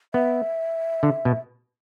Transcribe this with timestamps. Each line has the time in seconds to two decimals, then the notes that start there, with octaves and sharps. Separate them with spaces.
0.14 B3 E5
1.03 D3
1.25 B2